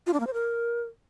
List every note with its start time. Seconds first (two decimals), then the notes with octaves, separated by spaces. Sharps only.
0.06 F4
0.13 D4
0.20 A#3
0.27 C5
0.33 A#4